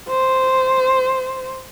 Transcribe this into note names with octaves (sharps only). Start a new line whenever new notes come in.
C5